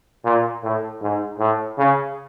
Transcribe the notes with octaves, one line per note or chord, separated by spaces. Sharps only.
A#2
A2
G#2
A2
C#3